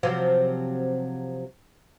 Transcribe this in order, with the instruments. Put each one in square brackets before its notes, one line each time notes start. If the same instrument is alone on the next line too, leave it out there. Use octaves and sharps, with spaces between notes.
[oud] C3 F3 F#3